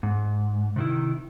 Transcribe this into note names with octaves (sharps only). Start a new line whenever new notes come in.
G#2
C3 D#3 E4